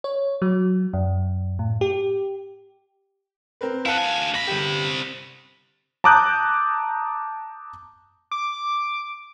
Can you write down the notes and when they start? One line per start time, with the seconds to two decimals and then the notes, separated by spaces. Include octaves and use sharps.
0.04 C#5
0.42 F#3
0.93 F#2
1.59 A2
1.81 G4
3.61 C4 A#4 B4
3.86 E4 F5 F#5 A5
3.98 D2 G#5
4.34 C3 B5 A#6
4.47 G1 G4
6.04 A5 A#5 D6 D#6 F#6 G6
8.31 D6